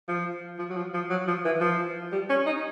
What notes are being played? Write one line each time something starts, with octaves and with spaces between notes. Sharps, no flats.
F3
F3
F#3
F3
F3
F#3
F3
E3
F3
G3
C#4
D#4